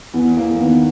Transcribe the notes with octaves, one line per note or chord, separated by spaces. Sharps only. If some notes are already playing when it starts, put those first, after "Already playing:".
E2 B3
E2 A#3
A#3
D#3 B3